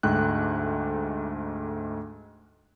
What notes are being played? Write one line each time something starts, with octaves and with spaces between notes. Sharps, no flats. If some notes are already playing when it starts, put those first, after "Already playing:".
D2 G#2 A3 G5 F#6